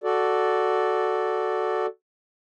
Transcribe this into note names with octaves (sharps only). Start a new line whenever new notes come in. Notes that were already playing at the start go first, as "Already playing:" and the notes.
F#4 A4 D5